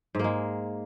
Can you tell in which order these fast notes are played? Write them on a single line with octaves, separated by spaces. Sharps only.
G#2 A#3 G#3